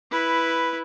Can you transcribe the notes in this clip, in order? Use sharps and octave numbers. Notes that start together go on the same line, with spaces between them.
E4 B4